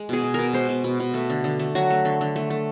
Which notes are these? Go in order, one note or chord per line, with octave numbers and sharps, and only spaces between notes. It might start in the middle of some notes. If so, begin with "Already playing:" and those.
Already playing: G#3
B2 G#4
B2
B2 A#4
G#3 C5
B2
B2
B2
A3
D3
D3
A3
F#3 F#4
A3
D3
D3
A3
A3